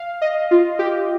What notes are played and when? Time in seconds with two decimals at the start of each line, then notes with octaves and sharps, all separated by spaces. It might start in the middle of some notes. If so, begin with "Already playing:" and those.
Already playing: F5
0.21 D#5
0.51 F4
0.79 G4